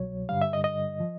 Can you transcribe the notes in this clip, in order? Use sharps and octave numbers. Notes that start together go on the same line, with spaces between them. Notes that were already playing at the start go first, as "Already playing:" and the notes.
Already playing: C2 B2 F#3 C#5
G2 D3 G3 F5
E5
D#5
D#5
F3